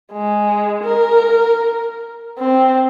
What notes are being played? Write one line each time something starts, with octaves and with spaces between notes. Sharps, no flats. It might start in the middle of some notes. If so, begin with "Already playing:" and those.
G#3
A#4
C4